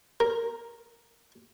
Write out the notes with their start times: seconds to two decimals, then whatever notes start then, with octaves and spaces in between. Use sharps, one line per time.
0.20 A#4